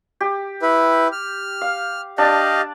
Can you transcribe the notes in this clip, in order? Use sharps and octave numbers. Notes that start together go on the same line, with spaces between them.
G4
E4 B4
F6
F5
D4 G4 D#5 F5 A5